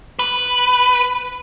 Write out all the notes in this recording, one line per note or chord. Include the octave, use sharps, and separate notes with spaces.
B4